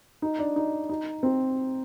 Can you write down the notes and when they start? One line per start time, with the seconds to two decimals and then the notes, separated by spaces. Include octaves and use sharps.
0.22 D#4
0.39 D4
0.56 D#4
0.89 D#4
1.23 C4